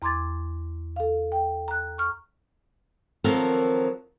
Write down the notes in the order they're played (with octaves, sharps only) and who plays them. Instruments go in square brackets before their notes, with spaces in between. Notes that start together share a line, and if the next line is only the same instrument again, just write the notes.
[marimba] E2 A#5 C6 D6 G#6 A6
A4 F5
G5
A#5 F#6
C#6 F6
[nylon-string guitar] D#3 F3 F#3 C4 A4 A#4